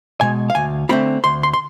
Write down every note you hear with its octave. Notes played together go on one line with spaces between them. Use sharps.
B2 G#3 G#5
F5
D2 G#5
D3 A3 C4 F4 B5
D2 C6
C6
C6